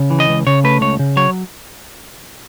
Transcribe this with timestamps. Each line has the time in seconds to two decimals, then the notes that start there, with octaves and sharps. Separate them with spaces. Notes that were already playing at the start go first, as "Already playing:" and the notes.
Already playing: C#3
0.10 E3
0.20 D#5
0.29 C#2
0.47 C#3 C#5
0.64 A3 B4
0.81 C#2 C#5
0.99 C#3
1.16 F#3 C#5